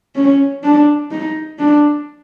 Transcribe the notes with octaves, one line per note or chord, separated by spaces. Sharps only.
C#4
D4
D#4
D4